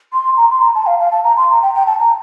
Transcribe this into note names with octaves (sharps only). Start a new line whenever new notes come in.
C6
A#5
C6
A#5
A5
F5
F5
A5
A#5
C6
A#5
G5
G5
A5
A#5